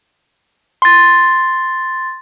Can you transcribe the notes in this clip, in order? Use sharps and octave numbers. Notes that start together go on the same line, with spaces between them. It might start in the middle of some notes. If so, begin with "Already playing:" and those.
C6 A6